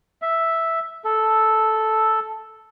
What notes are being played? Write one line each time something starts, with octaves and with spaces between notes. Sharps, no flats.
E5
A4